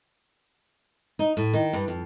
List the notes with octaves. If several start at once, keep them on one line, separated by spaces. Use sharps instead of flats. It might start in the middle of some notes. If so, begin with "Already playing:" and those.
D#4
A2
D#3
G2
F2